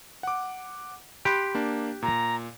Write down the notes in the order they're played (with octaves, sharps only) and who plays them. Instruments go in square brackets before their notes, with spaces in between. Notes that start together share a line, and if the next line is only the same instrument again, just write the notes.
[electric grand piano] F#5 D6
[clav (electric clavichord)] G4 [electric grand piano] B5 C6 F#6
[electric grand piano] A#3 D4
[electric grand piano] A#2 [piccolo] A#5